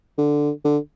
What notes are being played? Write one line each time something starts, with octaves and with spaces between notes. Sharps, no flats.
D3
D3